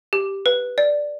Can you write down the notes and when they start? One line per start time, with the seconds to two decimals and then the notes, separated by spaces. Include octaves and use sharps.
0.13 G4
0.46 B4
0.78 D5